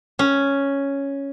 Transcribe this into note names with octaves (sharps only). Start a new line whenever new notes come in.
C#4